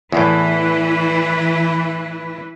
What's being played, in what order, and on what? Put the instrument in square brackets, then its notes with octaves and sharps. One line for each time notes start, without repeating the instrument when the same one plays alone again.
[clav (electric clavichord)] E2 A2 [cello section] E3 E4 B4